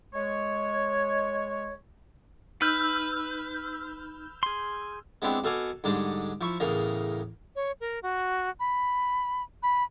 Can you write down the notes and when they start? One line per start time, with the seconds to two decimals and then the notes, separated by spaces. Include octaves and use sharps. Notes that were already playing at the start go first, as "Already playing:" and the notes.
0.13 G#3 C#5
2.62 D#4 B4 E6 F6 G6
4.43 G#4 C6
5.22 G#3 B3 C4 D4 E4 G4
5.44 B2 A4 F5 F#5 G#5 D6
5.84 G#2 D3 G3 G#3
6.41 F3 E4 C#6
6.60 E2 A2 C#3 A#4 A#5
7.56 C#5
7.80 A#4
8.03 F#4
8.60 B5
9.63 B5